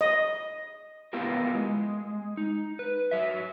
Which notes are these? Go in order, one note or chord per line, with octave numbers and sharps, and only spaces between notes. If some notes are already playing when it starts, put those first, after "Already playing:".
D#5
B3 E4 F4 G4 A#4
G#3
D#4
B4
F#3 E5